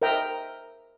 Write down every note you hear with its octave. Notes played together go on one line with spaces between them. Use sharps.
A#4 C5 D#5 E5 G5 A#5